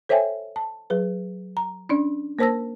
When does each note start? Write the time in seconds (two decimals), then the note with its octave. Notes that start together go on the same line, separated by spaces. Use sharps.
0.09 A4 C5 C#5 E5 G5 G#5
0.56 A5
0.90 F#3 G#4 B4
1.57 A#5
1.89 C#4 D4 D5
2.39 A#3 A#4 C5 A5 E6 A#6